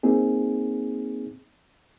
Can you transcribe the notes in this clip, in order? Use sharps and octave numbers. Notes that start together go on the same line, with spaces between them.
A#3 C4 D#4 G#4